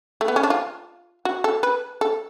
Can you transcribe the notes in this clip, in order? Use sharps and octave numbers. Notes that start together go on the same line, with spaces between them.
A3
B3
C#4
D4
F4
F#4
A4
B4
A4